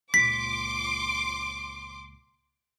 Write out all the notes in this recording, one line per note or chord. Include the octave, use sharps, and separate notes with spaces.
C#2 A#2 C6 D6 B6